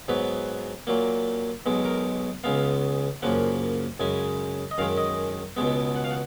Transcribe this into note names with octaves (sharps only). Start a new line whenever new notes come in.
G#2 F#3 B3 B4
A#2 F#3 A#3
B1 B2 G#3
A#4
C#2 C#3 G#3 B3 F5
F#2 C#3 F3 A#3 F#5
F#2 C#3 G#3 G#5
D#5
F#2 D#3 G#3 F5
D#5
C#2 B2 G#3 B3
F#5
F5
F#5